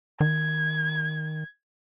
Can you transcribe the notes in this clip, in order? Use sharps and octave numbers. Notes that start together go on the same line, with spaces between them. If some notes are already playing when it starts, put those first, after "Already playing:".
D#3 G#6